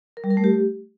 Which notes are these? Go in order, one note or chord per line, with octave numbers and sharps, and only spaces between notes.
A#4
G3
A#4
A3
G4